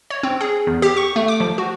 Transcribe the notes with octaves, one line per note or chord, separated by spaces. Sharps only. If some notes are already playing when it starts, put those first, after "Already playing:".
C#5
C4
G#4
E2
G4
C#6
A3
D6
F3
F#4